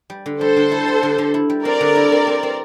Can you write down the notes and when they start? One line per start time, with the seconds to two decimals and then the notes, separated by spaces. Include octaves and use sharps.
0.10 G3
0.26 D3
0.41 G3 A4 C5
0.56 D3
0.72 E4
0.88 G3
1.03 D3
1.18 D3
1.34 E4
1.50 G3
1.65 C4 A#4 D5
1.81 D3
1.96 E4
2.12 C4
2.27 C4
2.43 C4